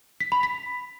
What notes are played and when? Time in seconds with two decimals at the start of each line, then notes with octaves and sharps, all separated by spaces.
0.20 B6
0.32 B5
0.43 B6